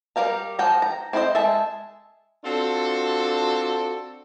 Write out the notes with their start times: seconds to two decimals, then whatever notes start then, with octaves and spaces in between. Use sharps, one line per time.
0.16 G3 A#4 F5 A#5
0.59 F3 F#5 G5 A#5
0.82 A#5
1.13 C4 E4 B4 C5 D#5
1.35 G#3 E5 A5
2.44 C4 D4 F4 F#4 A4